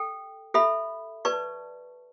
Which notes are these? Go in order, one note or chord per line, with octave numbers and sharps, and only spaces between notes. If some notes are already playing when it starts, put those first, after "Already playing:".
Already playing: A4 G5
A4 E5 B5
B4 D5 A5 C#6